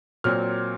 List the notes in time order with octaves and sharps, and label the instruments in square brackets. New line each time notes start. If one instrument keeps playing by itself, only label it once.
[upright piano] A#2 F#3 C4 F6